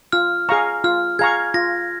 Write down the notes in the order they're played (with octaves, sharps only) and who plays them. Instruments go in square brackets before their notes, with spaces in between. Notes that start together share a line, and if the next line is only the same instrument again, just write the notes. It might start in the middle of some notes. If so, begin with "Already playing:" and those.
[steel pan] F4 [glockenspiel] F6
[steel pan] G#4 F5 A#5 C#6
[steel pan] F4 [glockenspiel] F6
[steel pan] G#4 F5 A#5 C#6 [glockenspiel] G#6
[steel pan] F4 [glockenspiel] A#6